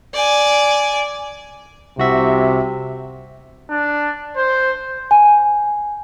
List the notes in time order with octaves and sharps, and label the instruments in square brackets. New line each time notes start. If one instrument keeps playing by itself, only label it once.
[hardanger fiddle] D5 G#5
[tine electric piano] C2 F#4 E5 [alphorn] C3
[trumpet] D4
C5
[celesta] G#5